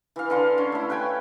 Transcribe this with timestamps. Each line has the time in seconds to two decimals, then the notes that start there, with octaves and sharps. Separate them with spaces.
0.16 E3 F5
0.30 D3 F5 C6
0.58 C#4 C#5
0.72 A3 E4
0.90 B4 F5 G5 G#5